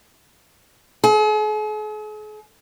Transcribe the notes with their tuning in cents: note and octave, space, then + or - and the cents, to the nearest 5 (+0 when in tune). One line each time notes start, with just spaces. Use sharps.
G#4 +45